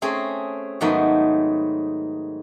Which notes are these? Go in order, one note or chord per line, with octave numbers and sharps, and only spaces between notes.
A3 C4 C#4 G#4
G#2 D#3 F#3 A3 B3 B5